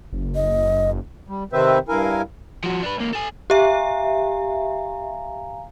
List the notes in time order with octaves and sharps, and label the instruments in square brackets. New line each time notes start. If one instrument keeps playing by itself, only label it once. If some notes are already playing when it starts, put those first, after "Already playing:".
[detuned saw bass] F#1
[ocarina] D#5
[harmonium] G3
C3 D#3 C4 B4 C5 E5
G2 E4 A#4 F5 G#5
[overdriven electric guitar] F3 F#4
D4 B4
C#2 A#3
A4 G#5
[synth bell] G4 E5 [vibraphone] F5 G#5 A#5